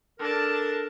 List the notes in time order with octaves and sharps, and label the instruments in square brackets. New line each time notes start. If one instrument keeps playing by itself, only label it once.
[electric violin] D4 A5 [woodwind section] A4 A#4